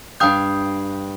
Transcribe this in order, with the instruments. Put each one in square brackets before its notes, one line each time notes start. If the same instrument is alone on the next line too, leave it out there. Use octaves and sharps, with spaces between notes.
[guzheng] G2 F5 [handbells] G5 D#6 G6